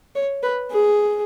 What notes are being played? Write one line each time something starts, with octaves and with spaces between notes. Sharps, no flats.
C#5
B4
G#4